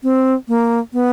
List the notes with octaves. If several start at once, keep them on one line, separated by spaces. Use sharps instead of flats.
C4
A#3
B3